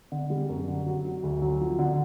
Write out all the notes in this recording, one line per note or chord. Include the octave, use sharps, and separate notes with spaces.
D3
G3
F#2
D3
F#3
F#3
D2
F#3
F3
D3